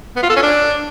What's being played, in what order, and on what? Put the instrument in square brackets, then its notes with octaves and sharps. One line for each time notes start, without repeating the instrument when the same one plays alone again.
[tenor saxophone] B3
F4
A4
C#4
D4